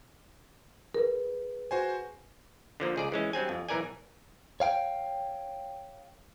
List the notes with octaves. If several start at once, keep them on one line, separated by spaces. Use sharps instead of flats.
G#4 A#4 B4
F#4 C5 G#5
D3 F3 A#3
C#2 G#4 D5
E3 G#3 C#4
G2 F#3 C4 G#5
F2
B1 E3 A#4 D5 G#5
C#5 F5 G5